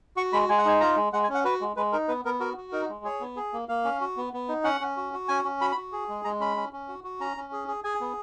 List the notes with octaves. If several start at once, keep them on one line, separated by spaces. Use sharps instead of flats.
F#4 C#6
G#3 B5
G#3 G#5
F#5
D#4 G#5
F4 A#5
G#3
G#3 F#5
G#5
C#4
F#5
F#4 B4
G#3
G#3 B4
D#4 A#4
B3 B4
B3 A#4
F#4 A#4
F#4
D#4 A#4
G#3
G#4 C#5
B3
G#4
A#3
A#3 F5
C#4
F#4
B3
B3
D#4
C#4 F#5
C#4
F#4
F#4
C#4 G#5
C#4
F#4 B5
B5
F#4
G#4
G#3
G#3 A#5
C#4 B5
C#4
C#4
F#4
F#4
C#4 A#5
C#4
G#4
G#4
G#4 G#5
B3